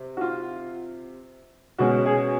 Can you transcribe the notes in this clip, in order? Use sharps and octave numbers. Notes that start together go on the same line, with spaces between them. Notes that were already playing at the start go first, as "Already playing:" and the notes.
Already playing: C3
F#4
F4
B2 G#3 C#4 F#4
G#4